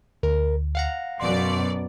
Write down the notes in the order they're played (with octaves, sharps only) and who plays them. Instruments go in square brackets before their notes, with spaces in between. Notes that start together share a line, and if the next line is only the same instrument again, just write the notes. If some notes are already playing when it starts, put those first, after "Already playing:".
[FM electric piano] D2 [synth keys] A#4
[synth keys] F5 F#5 A#5
[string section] F#2 B2 D5 [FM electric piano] C6